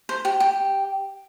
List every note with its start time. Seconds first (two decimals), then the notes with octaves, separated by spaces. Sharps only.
0.09 C5
0.25 G4
0.40 G4